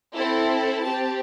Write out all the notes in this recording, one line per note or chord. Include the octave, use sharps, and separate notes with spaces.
C4 E4 A4
C4 G4 A5